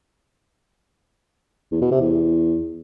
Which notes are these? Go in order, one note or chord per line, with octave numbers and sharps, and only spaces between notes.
E2
B2
C3
E2